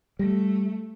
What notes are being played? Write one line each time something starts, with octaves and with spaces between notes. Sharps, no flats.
G3 A3